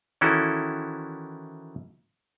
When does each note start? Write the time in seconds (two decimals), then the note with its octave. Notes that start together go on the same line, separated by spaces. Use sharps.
0.21 D#3 E3 C#4 E4 F#4 A4